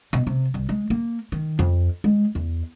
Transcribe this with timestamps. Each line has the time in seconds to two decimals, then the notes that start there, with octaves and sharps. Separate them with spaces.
0.13 B2
0.27 C3
0.54 C2
0.69 G#3
0.90 A#3
1.32 D#3
1.59 F2
2.04 G#3
2.35 E2